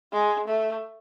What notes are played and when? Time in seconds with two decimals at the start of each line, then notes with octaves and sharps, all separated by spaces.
0.12 G#3
0.47 A3